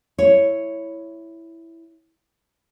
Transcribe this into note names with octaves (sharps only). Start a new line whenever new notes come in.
E4 C#5